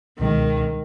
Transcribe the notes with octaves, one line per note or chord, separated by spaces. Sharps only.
C#2 B2 D#3 G#3